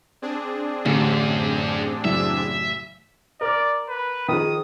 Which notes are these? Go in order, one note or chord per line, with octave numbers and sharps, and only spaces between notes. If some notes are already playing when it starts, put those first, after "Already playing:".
C4 D4 G#4
A1 F#2 D3
F#1 E3 F#3 E5
A#4 D5 F6
B4
D#3 F3 G#4 D#6